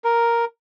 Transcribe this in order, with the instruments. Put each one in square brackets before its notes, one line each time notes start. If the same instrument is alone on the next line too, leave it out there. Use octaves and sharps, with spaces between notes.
[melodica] A#4